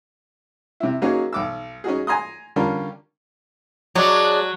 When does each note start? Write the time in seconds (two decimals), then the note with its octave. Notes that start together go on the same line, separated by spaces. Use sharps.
0.80 C3 E4
1.02 F#3 A#3 C#4 D#4 F#4 G#4
1.33 B1 D6 E6
1.84 C#4 D#4 F#4 G#4
2.07 G#5 A#5 C6 D#6
2.56 D3 G3 C#4 F4 A#4
3.95 F#3 G#3 D4